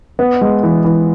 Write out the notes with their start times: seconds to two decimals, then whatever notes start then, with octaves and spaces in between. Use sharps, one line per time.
0.19 B3
0.41 G#3
0.63 E3
0.84 E3